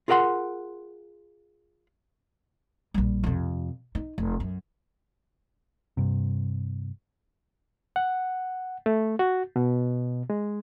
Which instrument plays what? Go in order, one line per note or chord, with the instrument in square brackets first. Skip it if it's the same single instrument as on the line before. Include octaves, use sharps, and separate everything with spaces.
[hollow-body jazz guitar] F4 G#4 A#4 D5 F#5 C6
[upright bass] A#1 G3
F2 C3
D#4
F1
F#2
[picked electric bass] G2 C3
[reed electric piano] F#5
A3
F#4
B2
G#3